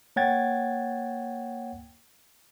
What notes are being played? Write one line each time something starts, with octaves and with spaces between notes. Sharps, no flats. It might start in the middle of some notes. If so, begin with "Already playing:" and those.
A#3 C#5 F#5 G5 G#6 A6